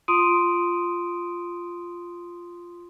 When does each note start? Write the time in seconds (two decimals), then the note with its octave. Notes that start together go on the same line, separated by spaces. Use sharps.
0.08 F4 C6 D#6 D7 D#7